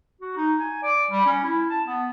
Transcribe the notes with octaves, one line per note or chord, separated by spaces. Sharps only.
F#4
D#4
G#5
D5
G3
C#4
E4
A5
B3